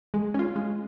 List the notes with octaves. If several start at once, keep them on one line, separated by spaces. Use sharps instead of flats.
G#3
C#4 F4
G#3